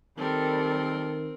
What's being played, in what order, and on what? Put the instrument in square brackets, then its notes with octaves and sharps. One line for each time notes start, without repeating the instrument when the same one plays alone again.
[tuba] D#3 [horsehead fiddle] G3 A4 [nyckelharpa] C4 A#4